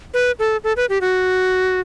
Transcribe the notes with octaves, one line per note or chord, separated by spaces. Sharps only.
B4
A4
A4
B4
G4
F#4